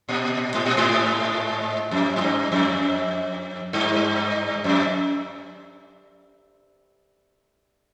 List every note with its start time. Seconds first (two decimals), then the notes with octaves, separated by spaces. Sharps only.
0.09 A#2
0.54 G#2
0.66 A#2
0.77 G#2
1.91 F2
2.16 G#2
2.21 G2
2.52 F2
3.73 G2
4.64 F2